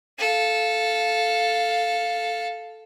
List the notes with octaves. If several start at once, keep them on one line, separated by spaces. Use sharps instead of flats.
A4 F5